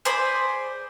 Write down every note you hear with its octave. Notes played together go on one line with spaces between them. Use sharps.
G#4 C5 D5 B5